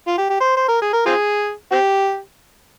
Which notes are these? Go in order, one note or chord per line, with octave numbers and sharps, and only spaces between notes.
F4
G4
G4
C5
C5
A#4
G#4
A#4
C4 F4 G#4
C4 G4